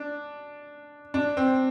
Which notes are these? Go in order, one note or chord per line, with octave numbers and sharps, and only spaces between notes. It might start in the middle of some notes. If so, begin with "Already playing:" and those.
Already playing: D4
D4
C4